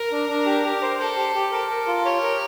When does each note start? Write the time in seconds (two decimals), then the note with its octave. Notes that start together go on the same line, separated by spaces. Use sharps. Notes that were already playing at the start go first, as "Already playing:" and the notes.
Already playing: A#4
0.12 D4
0.29 D4
0.46 G4
0.65 G4
0.82 C5
0.99 A4 C5
1.17 G4
1.35 G4
1.52 A4 A#4
1.70 A#4
1.87 F4
2.05 G4 C#5
2.23 A#4